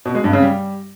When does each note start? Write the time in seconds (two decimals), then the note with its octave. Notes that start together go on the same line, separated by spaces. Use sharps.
0.05 B2
0.15 G#3
0.24 G2
0.33 C#3
0.42 G3